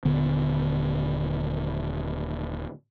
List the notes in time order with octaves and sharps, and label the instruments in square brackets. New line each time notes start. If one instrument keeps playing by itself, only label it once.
[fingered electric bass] D#1 D3 B3